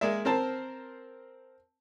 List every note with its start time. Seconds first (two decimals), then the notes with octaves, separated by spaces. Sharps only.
0.01 G#3 A#3 D5 E5
0.25 C4 A#4 C5 A5